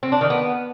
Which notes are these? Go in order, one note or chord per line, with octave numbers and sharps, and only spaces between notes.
C4
D4
D#3
B3